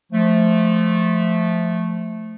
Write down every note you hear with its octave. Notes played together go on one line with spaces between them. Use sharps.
F3 A3